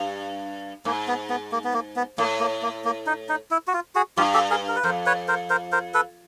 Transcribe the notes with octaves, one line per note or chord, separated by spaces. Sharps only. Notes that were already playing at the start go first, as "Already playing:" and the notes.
Already playing: G2
G#2 A#3
B3
B3
A#3
B3
A#3
B3
A2 A#3
A#3
A#3
A#3
D#4
D#4
E4
F#4
F4
F#4 G#4
G2 F4 G4
G4 A4
G#4 A#4
A#4
B4
F2 A#4 C5
B4 C#5
A#4 C5
A#4 C5
A#4 C5
A4 B4